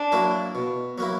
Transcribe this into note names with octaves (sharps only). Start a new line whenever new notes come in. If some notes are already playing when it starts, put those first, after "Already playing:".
Already playing: D4
F#3 A#3 E4
B2
F#3 A#3 E4